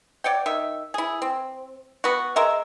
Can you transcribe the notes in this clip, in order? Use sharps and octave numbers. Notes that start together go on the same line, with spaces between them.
C#5 D5 F#5 G5
D#3 E5
E4 G#4
C4
B3 F#4
G#3 A#4 E5